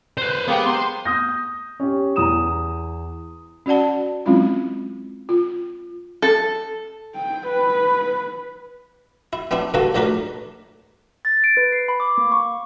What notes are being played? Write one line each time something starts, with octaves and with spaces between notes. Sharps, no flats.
B4 C5
G#3 A#3 B3 G4
C5 C6
D#6 F6 G6 A#6
C#4 G4
E2 A#5 D#6 E7
C#4 F#4 D5 F#5 A5
F#3 G#3 C4 C#4 E4 F4
F4
A4
G5
B4
E4
B3 C4 D4 E4
G2 D3 A#3 F#4 A4 A5
A#1 A3 D4 A#4 B4 B5
A6
D7
B4
C7
B5
D6
A#3
C#6